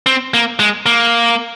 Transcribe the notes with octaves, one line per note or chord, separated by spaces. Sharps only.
C4
A#3
G#3
A#3